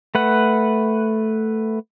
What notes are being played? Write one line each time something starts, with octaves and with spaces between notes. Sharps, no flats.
A3 B4 F#5